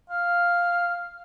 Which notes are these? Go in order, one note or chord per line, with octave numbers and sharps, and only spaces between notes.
F5